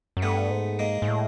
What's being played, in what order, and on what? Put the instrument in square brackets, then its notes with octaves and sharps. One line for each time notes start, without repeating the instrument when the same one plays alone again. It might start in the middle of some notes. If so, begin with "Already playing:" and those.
[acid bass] F#2
[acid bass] G2 [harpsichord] A3 B3
[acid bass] G#2
[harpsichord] G#3 A#3
[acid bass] G#2
A2